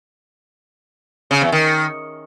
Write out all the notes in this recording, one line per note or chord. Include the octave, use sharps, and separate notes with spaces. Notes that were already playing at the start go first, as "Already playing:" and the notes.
C#3
E2
D#3